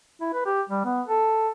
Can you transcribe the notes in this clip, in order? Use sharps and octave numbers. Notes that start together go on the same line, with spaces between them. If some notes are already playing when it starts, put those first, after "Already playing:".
E4
B4
G4
G3
B3
A4